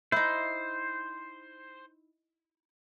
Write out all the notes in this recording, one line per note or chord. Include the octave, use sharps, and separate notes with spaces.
D#4 E4 C5